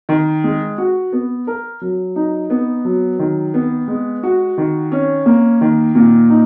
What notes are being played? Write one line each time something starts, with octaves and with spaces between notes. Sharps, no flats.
D#3
G#3
F#4
B3
A#4
F#3
D#4
B3
F#3
D#3
B3
G#3
F#4
D#3
C#4
A#3
D#3
A#2
D#4